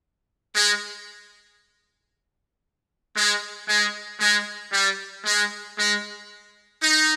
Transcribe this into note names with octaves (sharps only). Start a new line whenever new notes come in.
G#3
G#3
G#3
G#3
G3
G#3
G#3
D#4